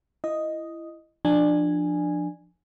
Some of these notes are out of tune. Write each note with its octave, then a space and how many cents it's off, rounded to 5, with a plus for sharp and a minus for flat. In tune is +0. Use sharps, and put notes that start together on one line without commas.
E4 +20 D#5 +0
F3 +0 D4 +20 G#5 -5